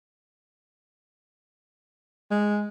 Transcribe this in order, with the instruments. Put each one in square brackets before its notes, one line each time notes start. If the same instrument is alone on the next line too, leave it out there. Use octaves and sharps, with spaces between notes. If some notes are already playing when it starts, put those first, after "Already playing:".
[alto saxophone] G#3